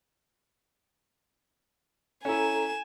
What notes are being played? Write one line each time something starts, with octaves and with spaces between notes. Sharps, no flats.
C#4 E4 A4 G#5 A#5 E7